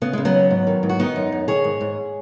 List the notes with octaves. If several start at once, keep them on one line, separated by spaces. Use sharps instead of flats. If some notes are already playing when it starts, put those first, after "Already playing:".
C#3 B3
C#3 G#3
F#3 B3
D#2
G#2
D#3
G#2
F#4
D#3 B3 D#4
F#2
F#2
D#3 G#4 C#5
G#2
G#2